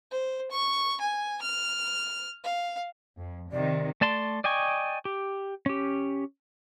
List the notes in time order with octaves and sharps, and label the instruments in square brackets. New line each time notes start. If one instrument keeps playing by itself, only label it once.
[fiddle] C5
C#6
G#5
F6
F5
[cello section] F2
[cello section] C3 D#3 [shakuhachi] D5
[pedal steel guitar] A3 D5 A5 C6
D5 D#5 G5 G#5 C#6
G4
C#4 G4